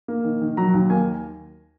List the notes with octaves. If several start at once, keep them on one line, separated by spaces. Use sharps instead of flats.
A#3
D#3
D#3
F#3 A#5
D#2
A#3 G#5